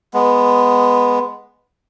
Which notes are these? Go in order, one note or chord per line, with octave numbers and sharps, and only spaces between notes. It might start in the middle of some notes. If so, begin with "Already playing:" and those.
G#3 B3